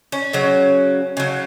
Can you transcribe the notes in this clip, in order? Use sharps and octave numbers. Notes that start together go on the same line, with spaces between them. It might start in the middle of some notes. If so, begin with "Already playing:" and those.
C#4
C#3 F#3
C#3 F#3